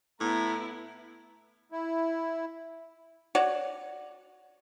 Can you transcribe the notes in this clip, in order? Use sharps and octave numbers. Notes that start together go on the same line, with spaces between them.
A2 B3 E4 A#5
E4
F#4 C#5 D5